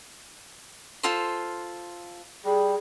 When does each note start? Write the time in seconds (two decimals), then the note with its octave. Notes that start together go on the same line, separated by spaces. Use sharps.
1.03 F4 A4 C5
2.45 G3 G#4